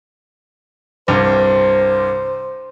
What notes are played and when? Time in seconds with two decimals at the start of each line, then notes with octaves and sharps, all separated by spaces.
1.08 C2 G2 C5